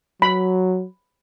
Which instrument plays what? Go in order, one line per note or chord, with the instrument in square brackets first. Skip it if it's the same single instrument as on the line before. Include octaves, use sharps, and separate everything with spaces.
[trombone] F#3 [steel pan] B5